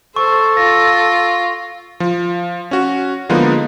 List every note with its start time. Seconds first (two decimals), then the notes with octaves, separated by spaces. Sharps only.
0.16 A4 C5 C#6
0.57 F4 A#6
2.00 F3
2.71 C#4 F#4
3.29 D3 F3 G#3 A#3 B3 D#4